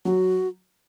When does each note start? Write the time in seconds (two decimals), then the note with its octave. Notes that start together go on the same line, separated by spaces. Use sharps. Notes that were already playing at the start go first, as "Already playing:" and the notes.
0.05 F#3 F#4